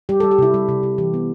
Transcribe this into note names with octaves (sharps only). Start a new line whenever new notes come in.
G3 G4
A4
G3
G4
C3 E4
G3
C3
C3
E3 G4
B3